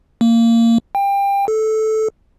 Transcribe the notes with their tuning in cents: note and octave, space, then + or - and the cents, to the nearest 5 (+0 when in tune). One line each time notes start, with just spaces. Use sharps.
A#3 -20
G5 +25
A4 -10